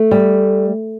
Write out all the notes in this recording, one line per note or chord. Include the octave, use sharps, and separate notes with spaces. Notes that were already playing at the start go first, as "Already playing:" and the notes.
Already playing: A3
G3